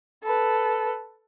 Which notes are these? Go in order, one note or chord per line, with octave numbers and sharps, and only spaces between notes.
A4 B4